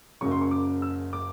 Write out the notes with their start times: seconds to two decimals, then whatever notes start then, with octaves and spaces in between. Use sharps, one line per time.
0.21 F#1 F#2 C#3 F#3 C#6
0.31 C6
0.41 C#6
0.51 D6
0.82 E6
1.13 D6